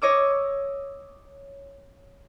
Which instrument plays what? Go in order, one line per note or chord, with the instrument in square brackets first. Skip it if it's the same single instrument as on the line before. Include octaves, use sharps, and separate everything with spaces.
[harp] C#5 D#5 D6 E6